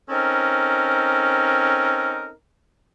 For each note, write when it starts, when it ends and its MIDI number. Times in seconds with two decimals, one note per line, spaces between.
0.10 2.31 60
0.10 2.31 61
0.10 2.31 63
0.10 2.31 69
0.10 2.31 70